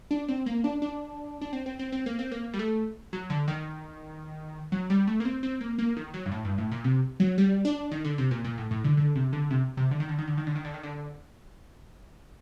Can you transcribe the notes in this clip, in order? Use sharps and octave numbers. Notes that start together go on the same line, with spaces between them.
D4
C4
A#3
D4
D4
D4
C4
C4
C4
C4
A#3
C4
A#3
G3
A3
F#3
D3
D#3
F#3
G3
A3
A#3
C4
C4
A#3
A#3
D#3
F#3
G2
A2
G2
A2
A#2
C3
F#3
G3
D4
D#3
D3
C3
A#2
A#2
A2
A2
D3
D3
C3
D3
C3
C3
D3
D#3
D3
D#3
D3
D#3
D3
D#3
D3
D#3
D3